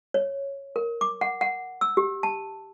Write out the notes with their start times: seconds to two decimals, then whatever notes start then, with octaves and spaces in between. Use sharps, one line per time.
0.14 C#5
0.76 A#4
1.01 D6
1.21 F#5
1.41 F#5
1.81 E6
1.97 G4
2.23 A5